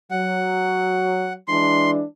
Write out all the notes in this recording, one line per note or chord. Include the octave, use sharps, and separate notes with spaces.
F#3 F#5
E3 G#3 D4 C6